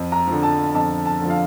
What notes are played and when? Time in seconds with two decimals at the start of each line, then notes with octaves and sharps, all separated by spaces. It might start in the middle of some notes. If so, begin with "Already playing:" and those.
Already playing: F2
0.12 A#5
0.27 D3 F3
0.43 A5
0.75 F2 A5
1.06 A5
1.21 D3 F3
1.30 F5